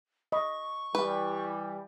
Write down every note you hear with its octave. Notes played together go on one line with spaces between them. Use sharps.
D#5 B5 C#6
E3 G3 B4